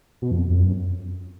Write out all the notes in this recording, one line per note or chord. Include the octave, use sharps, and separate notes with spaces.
B2
F2
F2
F#2